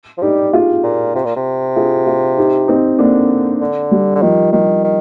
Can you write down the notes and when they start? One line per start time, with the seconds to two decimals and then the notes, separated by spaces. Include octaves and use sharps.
0.18 F3
0.22 G3 D#4 G4
0.53 F4 G#4
0.83 A#2
1.15 C3
1.25 A#2
1.36 C3
1.76 F4 G#4
2.07 F4 G#4
2.37 D#4 G4
2.68 C4 D#4
2.99 D3 A#3 D4
3.61 D3
3.91 G3
4.15 D3
4.22 D#3 F3
4.52 D#3 G3
4.84 D#3